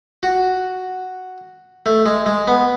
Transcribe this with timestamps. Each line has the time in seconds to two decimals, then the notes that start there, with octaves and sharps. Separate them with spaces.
0.23 F#4
1.86 A3
2.06 G#3
2.26 G#3
2.47 B3